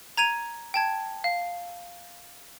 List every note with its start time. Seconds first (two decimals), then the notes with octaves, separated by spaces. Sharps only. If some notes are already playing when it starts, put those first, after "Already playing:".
0.17 A#5 G#6 D#7 F7
0.74 G5 A5 G#6
1.24 F5